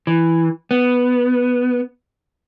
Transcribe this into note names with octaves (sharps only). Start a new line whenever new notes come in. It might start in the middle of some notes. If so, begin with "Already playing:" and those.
E3
B3